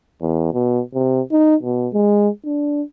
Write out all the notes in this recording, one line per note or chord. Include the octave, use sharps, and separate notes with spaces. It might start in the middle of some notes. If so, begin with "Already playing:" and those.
E2
B2
C3
D#4
B2
G#3
D4